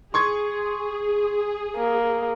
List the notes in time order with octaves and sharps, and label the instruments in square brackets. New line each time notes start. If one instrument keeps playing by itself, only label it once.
[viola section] G#4 [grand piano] C6 C#6 G#6
[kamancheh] A#3